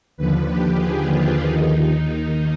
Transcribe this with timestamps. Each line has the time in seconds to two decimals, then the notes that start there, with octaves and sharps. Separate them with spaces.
0.17 D#2 D3 F3 B4
0.48 G4
0.79 G#4
1.10 F4
1.41 D#2 D#3 D#4